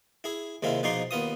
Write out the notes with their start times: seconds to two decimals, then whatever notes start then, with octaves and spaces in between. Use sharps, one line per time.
0.24 E4 G#4
0.63 D#2 C3 G#3 E4 F4
0.83 B2 F3 D#4 G#4 D5 C6
1.11 D#2 B3 F4 D#6